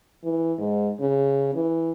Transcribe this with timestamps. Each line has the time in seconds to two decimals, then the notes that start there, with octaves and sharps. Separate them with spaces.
0.23 E3
0.58 G#2
1.00 C#3
1.55 E3